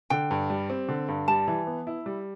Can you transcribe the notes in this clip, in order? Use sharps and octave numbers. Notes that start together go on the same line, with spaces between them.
D3 G5
G2
G3
C4
D3
G2
G3 A5
E3
B3
E4
G3